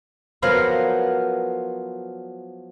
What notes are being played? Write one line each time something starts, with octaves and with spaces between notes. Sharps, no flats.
F3 F#3 B3 A#4 C5 F5